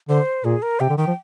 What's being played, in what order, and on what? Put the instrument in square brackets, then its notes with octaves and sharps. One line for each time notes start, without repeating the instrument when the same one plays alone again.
[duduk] D3 [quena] C5
[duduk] A#2 [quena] G#4
[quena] A#4
[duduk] C3 [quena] G5
[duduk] D3
[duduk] D#3 [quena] G5
[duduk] F3